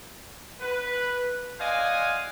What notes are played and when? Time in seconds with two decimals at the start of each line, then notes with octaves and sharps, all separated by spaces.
0.60 B4
1.59 C5 D5 D#5 F5 F#5 G#5